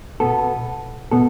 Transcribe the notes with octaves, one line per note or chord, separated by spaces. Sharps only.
B2 B3 A4
B2 B3 A4